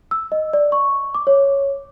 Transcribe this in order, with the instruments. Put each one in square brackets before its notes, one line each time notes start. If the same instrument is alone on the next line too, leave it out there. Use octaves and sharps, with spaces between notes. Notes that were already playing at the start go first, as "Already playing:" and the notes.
[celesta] E6
D#5
D5
C#6
D6
C#5